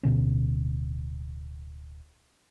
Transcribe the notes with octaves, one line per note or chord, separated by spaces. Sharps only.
D1 B2 D3 C#4